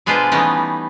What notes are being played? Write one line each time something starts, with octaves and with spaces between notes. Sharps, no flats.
B2 G#3 D4 F4 B4 C5
E3 G3 A3 B3 C#4 D#4